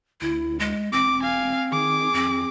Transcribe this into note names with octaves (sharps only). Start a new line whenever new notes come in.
D2 E4
G#3
E1 C4 D6
F5 G#5
D#3 G#4 D6
F2 C4